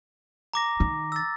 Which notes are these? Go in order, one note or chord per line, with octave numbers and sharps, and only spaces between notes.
A#5 D6 A#6
D#3
E6 A6